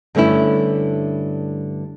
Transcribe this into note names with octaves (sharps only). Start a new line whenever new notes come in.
G2 D3 A3 C#4 E4